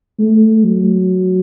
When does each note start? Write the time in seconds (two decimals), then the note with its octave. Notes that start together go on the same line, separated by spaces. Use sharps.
0.19 A3
0.64 F#3